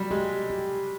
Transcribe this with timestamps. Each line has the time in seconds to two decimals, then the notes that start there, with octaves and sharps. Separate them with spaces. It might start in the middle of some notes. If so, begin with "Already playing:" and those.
Already playing: F#3 G3
0.11 G#3 G4
0.50 G4